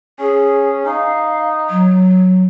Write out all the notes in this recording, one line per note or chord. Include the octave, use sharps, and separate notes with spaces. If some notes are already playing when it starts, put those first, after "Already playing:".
C#4 G#4
D#4 F5
F#3